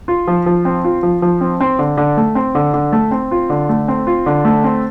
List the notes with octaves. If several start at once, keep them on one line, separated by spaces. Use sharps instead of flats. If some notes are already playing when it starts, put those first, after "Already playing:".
F4
F3
F3
C4
F4
F3
F3
C4
C4
D3
D3
A3
C4
D3
D3
A3
C4
F4
D3
A3
C4
F4
D3
A3
C4